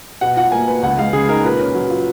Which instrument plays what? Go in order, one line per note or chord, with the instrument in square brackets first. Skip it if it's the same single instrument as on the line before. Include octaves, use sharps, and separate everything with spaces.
[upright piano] B2 [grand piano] F#5
[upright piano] F4 [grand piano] F#5
[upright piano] A#3 [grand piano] G#5
[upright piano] B4
[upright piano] C#2 [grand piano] F#5
[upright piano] G#3 [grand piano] F5
[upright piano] C#3 [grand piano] G#4
[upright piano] D#4 [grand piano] A#4
[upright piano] A#2 [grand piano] B4
[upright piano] C#4
F#3
F4